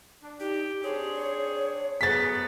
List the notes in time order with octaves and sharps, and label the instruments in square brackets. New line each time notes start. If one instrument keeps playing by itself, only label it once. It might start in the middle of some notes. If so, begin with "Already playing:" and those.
[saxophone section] D4
[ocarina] D#4 [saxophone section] G4
[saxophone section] C4 D4 G#4 [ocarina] C#5
[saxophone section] F#3 A3 B3 [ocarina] G#4 [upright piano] A6 B6